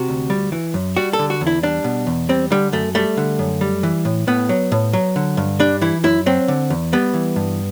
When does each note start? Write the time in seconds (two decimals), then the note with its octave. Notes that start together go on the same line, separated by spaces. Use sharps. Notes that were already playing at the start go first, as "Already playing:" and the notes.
Already playing: C3 F#4
0.09 D2
0.30 G3
0.52 E3
0.74 F#2
0.97 G3 F#4
1.13 A4
1.19 D3
1.30 F#4
1.41 E2
1.47 E4
1.63 G3 D4
1.84 B2
2.07 E2
2.29 G3 C4
2.50 D3 G3
2.73 F#2 A3
2.95 G3 A3
3.17 D3
3.39 F#2
3.61 G3
3.83 E3
4.05 A2
4.27 A2 B3
4.49 F#3
4.72 A2
4.93 F#3
5.16 D3
5.37 G2
5.60 G3 D4
5.81 E3 E4
6.04 F#2 E4
6.26 F#3 C4
6.48 D3
6.70 E2
6.93 G3 B3
7.14 E3
7.36 G2